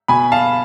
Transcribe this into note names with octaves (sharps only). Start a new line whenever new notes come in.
B2 G#5 B5
F5 A5